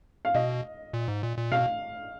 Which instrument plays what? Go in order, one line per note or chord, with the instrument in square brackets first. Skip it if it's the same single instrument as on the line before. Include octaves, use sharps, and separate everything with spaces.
[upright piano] F5
[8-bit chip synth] B2 [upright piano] D#5
[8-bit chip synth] A#2
G#2
A#2
A#2
[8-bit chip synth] B2 [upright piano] F5